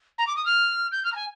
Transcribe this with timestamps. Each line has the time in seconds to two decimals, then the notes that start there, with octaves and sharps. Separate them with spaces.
0.18 A#5
0.27 D6
0.36 D#6
0.46 F6
0.92 G6
1.05 F6
1.13 A#5
1.16 G#5